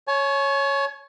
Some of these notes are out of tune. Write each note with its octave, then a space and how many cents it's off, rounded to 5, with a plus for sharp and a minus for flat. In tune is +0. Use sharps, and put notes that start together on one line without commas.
C#5 +0 G#5 +45